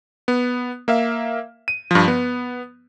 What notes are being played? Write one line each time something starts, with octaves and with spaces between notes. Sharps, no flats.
B3
A#3 E5 F5
D#7
G2 F3
B3